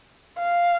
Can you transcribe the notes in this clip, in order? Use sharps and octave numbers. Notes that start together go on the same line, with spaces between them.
F5